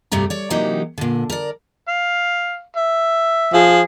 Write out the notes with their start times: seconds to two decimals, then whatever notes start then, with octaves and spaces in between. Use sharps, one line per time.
0.12 D2 G2 C3 G3 A3 A#5
0.30 C#5 D5
0.50 C3 E3 F#3 A#3 D#4 G4
0.98 A#2 D3
1.30 A#4 D5
1.88 F5
2.76 E5
3.53 F3 G#4